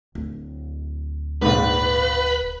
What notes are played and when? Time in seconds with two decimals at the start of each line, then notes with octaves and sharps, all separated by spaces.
0.15 D1
1.42 A#1 G#2 B4